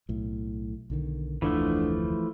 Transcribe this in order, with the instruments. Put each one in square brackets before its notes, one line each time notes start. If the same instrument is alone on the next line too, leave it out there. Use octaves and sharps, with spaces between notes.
[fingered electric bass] B1 A2
B1 D3 D#3
[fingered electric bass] F1 D2 [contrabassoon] D3 [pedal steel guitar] E3 F3 A3